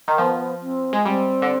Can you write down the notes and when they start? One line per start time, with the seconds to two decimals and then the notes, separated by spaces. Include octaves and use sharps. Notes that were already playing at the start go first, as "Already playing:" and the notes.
0.08 D#3
0.18 F3 B3
0.62 C4
0.93 G#3
1.05 G3 C4
1.42 D3